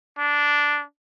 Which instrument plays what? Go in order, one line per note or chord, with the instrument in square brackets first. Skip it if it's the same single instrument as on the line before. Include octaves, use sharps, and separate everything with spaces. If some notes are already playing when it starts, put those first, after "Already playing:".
[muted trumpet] D4